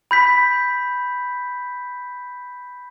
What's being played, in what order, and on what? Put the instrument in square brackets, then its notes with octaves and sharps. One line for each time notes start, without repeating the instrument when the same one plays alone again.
[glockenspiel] B5 G6 B6